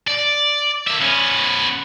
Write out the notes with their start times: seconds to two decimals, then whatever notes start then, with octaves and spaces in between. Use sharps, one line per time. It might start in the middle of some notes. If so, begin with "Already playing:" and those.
0.08 D5
0.87 A#3 E5
1.01 B3 C#4